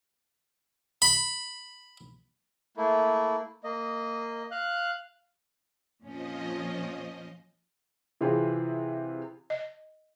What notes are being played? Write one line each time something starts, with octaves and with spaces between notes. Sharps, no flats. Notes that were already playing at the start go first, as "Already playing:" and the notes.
B5
A3 A#3 E4
A#3 D#5
F5 F#6
F2 A#2 F3 C#4 D#5
C3 E3 C4 F4 G#4
D#5